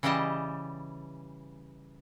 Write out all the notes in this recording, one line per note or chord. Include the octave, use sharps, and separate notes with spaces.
C#3 E3 G3 G4 D#5 A5